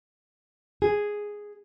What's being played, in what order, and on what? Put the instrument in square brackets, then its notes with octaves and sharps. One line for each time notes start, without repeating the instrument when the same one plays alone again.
[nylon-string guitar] G#4